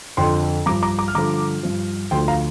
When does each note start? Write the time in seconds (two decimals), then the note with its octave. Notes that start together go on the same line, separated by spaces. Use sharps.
0.17 F2 D3 F3 G5 C6
0.66 G2 F3 A#5 D6
0.83 A#5 D6
0.98 A#5 D6
1.08 F6
1.15 G2 D3 F3 A#5 D6
1.63 G2 F3
2.11 D2 D3 F3 G5 C6
2.28 F5 A#5